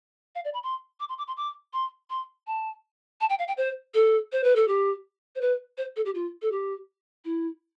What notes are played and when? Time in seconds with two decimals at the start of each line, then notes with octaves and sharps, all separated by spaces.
0.35 F5
0.45 D5
0.54 B5
0.63 C6
1.00 D6
1.09 C6
1.18 D6
1.27 C6
1.37 D6
1.73 C6
2.10 C6
2.47 A5
3.21 A5
3.30 G5
3.39 F5
3.48 G5
3.57 C5
3.94 A4
4.32 C5
4.44 B4
4.56 A4
4.68 G4
5.35 C5
5.41 B4
5.77 C5
5.96 A4
6.05 G4
6.15 F4
6.42 A4
6.52 G4
7.25 E4